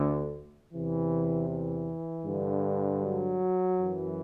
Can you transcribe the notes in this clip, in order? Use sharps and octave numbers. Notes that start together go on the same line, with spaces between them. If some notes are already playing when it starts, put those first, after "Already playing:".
Already playing: D2 D3
E2 C3 E3
E3
G2 D3
F#3
F#2 E3